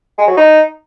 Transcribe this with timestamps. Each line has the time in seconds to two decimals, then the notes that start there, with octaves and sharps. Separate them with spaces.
0.18 G#3
0.28 F#3
0.37 D#4